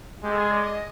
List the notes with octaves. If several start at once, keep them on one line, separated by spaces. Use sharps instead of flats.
G#3 G4
A4
G#4
D5
D#5